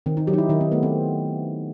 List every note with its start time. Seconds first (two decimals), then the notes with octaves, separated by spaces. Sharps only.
0.06 D#3 C4
0.17 D#4
0.27 F#3 G4
0.33 D#4
0.38 E4
0.49 D#3 D#4
0.61 C4
0.72 A3 B3
0.83 C4